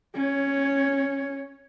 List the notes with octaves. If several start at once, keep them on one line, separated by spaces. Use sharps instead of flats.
C#4 C#5